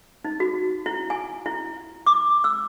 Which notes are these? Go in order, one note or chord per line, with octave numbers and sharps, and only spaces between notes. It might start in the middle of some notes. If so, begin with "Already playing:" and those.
D#4
F#4
E4
G#5
E4
D6
E6